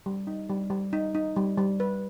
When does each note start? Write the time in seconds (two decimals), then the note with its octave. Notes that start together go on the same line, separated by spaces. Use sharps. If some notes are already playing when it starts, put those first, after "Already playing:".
0.06 G3
0.27 D#4
0.49 G3
0.70 G3
0.93 D#4
1.15 D#4
1.36 G3
1.58 G3
1.80 B4